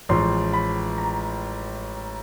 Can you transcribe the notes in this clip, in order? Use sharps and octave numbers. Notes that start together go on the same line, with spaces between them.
A1 A2 F3 G#3 C6
B5
A#5